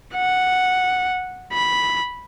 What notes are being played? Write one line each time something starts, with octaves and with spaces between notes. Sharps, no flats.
F#5
B5